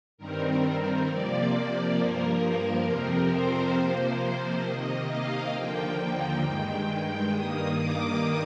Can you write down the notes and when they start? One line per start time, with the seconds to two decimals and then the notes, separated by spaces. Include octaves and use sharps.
0.18 G2 D#3 G3 C4 A#4
1.07 C3 F3 A#3 D5
1.97 G2 F3 A#3 A#4
2.86 F2 C3 F3 C4
3.30 C5
3.75 C3 F3 A#3 C5
4.64 C3 D#3 A#3 D#5
5.09 F5
5.54 D#2 D3 F3 A#3 G5
6.43 G2 D#3 G#3
7.32 G2 D#3 A#3 D#6
7.77 D6